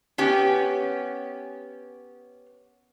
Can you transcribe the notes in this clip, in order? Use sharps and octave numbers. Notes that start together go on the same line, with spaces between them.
B3 C#4 G4